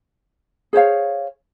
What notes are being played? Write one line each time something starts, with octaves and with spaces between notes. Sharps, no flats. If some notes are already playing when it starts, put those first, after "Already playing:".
G#4 C5 C#5 F5